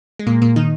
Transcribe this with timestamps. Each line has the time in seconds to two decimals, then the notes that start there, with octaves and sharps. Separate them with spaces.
0.19 G#3
0.27 A#2 A#3
0.42 A#2 A#3
0.56 D#3 D#4